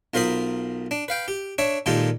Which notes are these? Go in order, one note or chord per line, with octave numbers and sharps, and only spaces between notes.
B1 F4 A#4 C5 B5 D#6
D4
B4 F5 G5
G4
D4 C#5 E5
A#2 D#3 G#3 F4 G4 A4